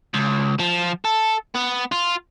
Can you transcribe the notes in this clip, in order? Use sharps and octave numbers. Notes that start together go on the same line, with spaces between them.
C#2
F3
A4
B3
F4